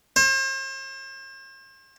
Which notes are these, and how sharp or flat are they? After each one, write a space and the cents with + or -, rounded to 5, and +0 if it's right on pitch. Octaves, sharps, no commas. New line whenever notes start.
C5 +40